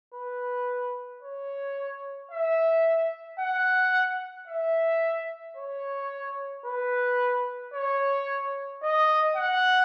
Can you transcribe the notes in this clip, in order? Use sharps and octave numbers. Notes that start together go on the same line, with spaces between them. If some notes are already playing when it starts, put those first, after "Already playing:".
B4
C#5
E5
F#5
E5
C#5
B4
C#5
D#5
F#5